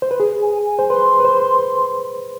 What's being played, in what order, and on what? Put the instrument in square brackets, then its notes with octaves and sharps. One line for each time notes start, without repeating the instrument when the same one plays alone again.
[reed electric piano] C5
B4
G#4
[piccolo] G#5
G#5
[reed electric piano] C5
[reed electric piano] B4 [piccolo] C6
[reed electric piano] B4
C5